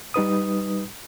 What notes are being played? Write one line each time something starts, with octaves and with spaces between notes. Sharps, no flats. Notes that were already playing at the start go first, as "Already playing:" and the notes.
G3 D#4 B4 D#6